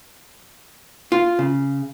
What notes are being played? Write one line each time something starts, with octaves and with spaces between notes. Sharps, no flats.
F4
C#3